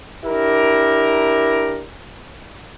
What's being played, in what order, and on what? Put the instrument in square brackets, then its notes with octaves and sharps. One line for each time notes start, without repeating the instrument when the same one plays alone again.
[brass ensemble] D4 E4 G4 A#4